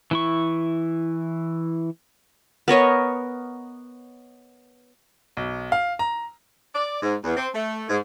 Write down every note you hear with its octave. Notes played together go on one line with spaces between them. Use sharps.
E3 E4 C#6
B3 A#4 C#5 D#5
B1
F5
A#5
D5
G#2
E2
C4
A3
G#2